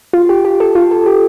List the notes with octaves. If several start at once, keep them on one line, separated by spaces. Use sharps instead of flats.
F4
G4
G4
A4
F4
A4
G4